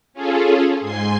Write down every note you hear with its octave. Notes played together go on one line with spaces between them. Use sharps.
C#4 F4 G#4 A4
G#2 G#5 C6 C7